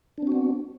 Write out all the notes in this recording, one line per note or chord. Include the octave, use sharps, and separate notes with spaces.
B3 C4 D4 F#4